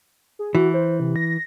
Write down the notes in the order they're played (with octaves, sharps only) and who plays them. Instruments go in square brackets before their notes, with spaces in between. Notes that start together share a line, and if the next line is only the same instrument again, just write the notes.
[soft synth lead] G#4
[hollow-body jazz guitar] E3 [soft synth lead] F#4
[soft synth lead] C5
C3
A#6